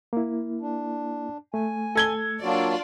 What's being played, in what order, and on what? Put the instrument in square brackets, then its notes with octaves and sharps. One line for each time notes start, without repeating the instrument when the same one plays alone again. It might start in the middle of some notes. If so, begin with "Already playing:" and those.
[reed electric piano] A#3 E4
[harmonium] D4
[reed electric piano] A3 [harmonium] G#5
[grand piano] A4 G#6 G7
[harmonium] F#3 A#3 F#4 [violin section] D4 F4 D5